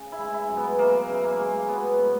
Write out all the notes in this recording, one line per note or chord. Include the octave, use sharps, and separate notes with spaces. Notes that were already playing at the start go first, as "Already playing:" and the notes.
Already playing: C#3
E4
G#3
E4
F#2
B3
E3 A#3
C#3
A#3
G#3
F#3 B3
A2